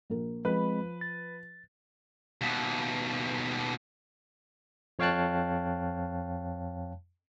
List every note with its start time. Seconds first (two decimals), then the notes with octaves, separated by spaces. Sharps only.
0.10 A#1 A#4
0.45 F3 G#3 C4 B4 B5
1.01 A6
2.41 D#2 B2
4.99 F2 C#5 F5 G5 A5 F#6